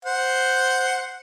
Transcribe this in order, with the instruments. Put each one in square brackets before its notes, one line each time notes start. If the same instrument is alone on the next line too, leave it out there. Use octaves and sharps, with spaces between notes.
[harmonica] C5 F#5